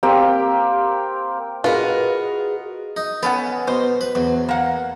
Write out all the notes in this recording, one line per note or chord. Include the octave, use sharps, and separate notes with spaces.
A#3 C4 G4
F4 F#4 G#4 A#4 B4 D#5
D#4
B3 C#4 A4 F#5
B2 C5
B4
E2 F#3
A#3 F#5